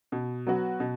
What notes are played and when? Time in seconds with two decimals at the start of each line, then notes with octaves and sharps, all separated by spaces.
0.12 B2
0.47 F#3 B3 F#4
0.80 B2